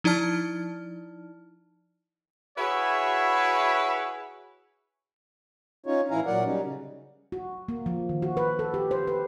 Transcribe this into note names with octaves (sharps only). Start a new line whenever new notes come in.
F3 D#4 E4 D5 A5 F6
E4 F#4 G#4 B4 C#5 E5
C#4 D#4 F4 C#5
A2 E3 E4 F5 G#5 A#5
A#2 F#3 A#4 D5 F#5
F#3 G3 C#4 D#4
C#3
F#4
A#3
F3
D#3
F#4
B4
A4
G4
C5
B4